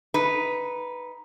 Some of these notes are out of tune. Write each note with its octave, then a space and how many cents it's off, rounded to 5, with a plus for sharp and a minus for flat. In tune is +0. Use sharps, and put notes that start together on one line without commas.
D#4 +15 B4 +0